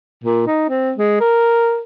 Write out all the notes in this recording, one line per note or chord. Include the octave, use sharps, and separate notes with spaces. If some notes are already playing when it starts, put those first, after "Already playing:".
A#2
D#4
C4
G#3
A#4